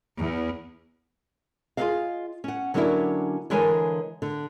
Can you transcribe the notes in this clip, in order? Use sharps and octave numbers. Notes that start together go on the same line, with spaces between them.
E2
F4 G#4 A4 B4 D#5 F5
C#4 F#5
D3 F#3 A#3 C#4 D4 E4
D3 E3 G#3 A#4 C#5 G#5
D3